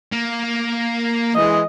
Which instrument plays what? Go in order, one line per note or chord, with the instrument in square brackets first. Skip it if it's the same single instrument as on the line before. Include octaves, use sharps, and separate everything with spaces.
[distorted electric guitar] A#3
[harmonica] E3 G#3 [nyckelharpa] D#5